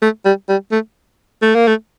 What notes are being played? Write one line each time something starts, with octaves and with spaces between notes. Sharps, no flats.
A3
G3
G3
A3
A3
A#3
A3